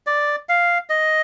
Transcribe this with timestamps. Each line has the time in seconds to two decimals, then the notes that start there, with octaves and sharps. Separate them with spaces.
0.07 D5
0.49 F5
0.90 D#5